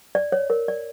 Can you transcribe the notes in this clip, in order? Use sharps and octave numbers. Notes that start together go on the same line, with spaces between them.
D5
C#5
A#4
D5